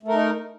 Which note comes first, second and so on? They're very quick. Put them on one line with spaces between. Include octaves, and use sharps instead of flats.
A3 A#4 D#4